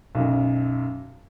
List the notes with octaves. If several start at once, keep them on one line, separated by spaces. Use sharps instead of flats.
B1 F#2